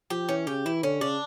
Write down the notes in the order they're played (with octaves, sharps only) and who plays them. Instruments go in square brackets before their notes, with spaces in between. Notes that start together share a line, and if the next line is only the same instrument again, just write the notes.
[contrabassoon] F3 [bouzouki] G4
[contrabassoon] E3 [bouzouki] C#4
[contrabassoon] C#3 [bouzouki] G4
[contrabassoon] E3 [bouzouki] E4
[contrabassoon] D3 [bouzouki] C#4
[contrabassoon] C#3 [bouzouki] D4